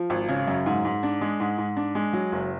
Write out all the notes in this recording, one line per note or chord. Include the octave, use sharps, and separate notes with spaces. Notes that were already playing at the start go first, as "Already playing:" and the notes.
Already playing: F3
G#1
C#3
F#2
G#2
G#2
D4
G#3
G#2
G#2
D4
G#3
F#3
F#1